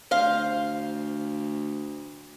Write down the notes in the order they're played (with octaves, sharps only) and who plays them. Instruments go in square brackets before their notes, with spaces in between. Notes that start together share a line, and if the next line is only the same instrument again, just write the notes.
[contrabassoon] D2 [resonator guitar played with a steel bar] C5 F5